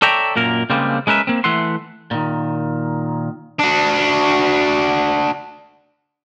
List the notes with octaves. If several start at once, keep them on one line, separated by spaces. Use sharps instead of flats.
A4 C#5 D5 E5 G5 A#5
F#2 A#2 A#3 A#4
C#3 G3 G#3 A#3 C4
G#3 C#4 A#4 B4 E5
A#3 C4
E3 A3 E5 F#5 C6
A#2 D#3
D4 F#4